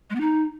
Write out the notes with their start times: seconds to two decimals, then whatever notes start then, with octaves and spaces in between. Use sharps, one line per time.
0.10 G#3
0.15 B3
0.21 D#4